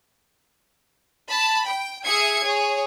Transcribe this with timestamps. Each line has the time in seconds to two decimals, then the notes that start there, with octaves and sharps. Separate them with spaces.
1.28 A5 B5
1.67 G5
2.06 G#4 E5 G#6 C#7
2.43 G#4 C#5